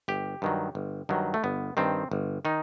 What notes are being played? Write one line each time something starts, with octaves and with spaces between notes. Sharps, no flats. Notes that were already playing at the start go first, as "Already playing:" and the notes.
G1 G4
G2 D#3 F#3
G1
G2 D#3 F#3
A3
G1 B3
G2 D#3 C4
G1
D#3 D#4